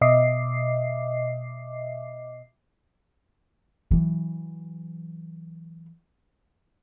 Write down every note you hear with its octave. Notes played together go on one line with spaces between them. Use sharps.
B2 D#5 E5 D6 C7
E3 F#3